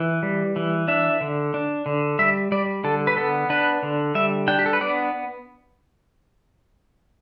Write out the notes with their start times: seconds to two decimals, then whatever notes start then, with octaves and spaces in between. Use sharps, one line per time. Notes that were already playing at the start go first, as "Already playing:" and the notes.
Already playing: E3
0.23 G3
0.56 E3
0.88 D4 E5
1.21 D3
1.54 D4
1.86 D3
2.19 G3 E5
2.52 G3 D5
2.84 D3 A4
3.07 B4
3.17 B3 A4
3.50 D4 B4
3.83 D3
4.15 G3 E5
4.48 D4 G5
4.59 G4
4.66 A4
4.73 B4
4.81 B3 D5